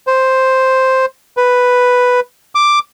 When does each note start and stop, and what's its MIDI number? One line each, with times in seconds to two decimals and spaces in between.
0.07 1.06 72
1.37 2.20 71
2.55 2.79 86